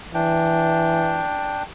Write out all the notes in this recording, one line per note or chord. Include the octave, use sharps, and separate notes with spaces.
E3 D4 G5